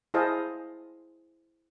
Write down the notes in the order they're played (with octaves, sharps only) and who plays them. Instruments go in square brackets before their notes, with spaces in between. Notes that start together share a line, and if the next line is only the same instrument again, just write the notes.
[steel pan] E4 G#4 C5 D#5 F5 A5